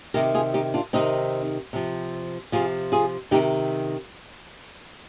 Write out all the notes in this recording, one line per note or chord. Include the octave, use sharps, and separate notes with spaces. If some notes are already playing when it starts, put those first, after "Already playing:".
C3 D#3 G4 A#4
F4 G#4
D#4 G4
D4 F4
C3 D#3 C4 D#4
C3 F3
C3 F3 F4 G#4
F4 G#4
C3 D#3 D#4 G4